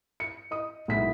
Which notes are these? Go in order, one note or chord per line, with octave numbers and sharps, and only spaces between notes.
C#7
D#5 D#6
B1 G#3 A#3 E4 B6